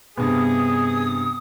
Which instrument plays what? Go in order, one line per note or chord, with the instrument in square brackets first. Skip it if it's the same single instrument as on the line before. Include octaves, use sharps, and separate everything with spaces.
[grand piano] G2 C3 [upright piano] B3 [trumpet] G#4 [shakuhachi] D#6